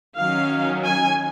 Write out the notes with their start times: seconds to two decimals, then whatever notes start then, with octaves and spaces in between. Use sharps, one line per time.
0.18 D#3 F#3 C#4 F5
0.83 G#5